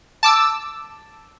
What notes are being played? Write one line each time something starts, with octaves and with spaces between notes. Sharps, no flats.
A5 D6 E6